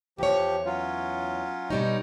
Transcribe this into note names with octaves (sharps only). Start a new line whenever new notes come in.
E2 F3 G4 C#5
F#3 C#4 F4
B2 G3 D#4 C#5